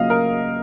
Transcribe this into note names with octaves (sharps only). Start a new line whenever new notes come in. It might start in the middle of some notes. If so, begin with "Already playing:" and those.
Already playing: C#3 F#3 A#3 F4 D#5 F5
A#4